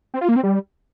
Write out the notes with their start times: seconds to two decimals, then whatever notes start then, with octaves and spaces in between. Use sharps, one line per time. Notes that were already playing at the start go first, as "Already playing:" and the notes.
0.14 C4
0.21 F4
0.29 A#3
0.36 C4
0.43 G3